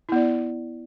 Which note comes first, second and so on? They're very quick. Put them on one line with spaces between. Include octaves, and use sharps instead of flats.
E4 B3 D5